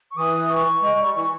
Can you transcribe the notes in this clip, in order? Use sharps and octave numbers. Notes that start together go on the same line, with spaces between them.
C#6
E3 D#6
C#6
G#3
G3
E3